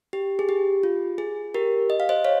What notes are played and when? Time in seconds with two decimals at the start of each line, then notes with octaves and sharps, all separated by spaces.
0.13 G4
0.39 G#4
0.49 G4
0.83 F4
1.18 G#4
1.54 G4 A#4
1.90 D#5
2.00 F5
2.09 C5 D#5
2.25 C#5 F5